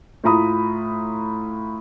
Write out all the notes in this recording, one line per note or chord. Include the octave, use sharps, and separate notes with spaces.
A2 F4 A#5 B5 D#6